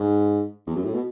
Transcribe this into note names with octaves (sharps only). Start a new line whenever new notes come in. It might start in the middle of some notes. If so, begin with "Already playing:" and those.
Already playing: G#2
E2
F#2
A2
B2